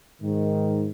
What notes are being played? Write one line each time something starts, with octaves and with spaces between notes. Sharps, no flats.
G#2 D#3